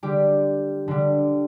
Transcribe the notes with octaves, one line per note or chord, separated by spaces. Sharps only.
D3 G3 G4
D3 G3